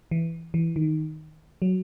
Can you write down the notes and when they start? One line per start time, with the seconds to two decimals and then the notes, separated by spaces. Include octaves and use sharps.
0.11 E3
0.54 E3
0.76 D#3
1.62 F#3